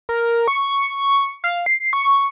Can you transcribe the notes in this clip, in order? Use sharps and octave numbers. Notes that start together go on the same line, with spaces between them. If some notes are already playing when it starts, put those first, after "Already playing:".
A#4
C#6
F5
C7
C#6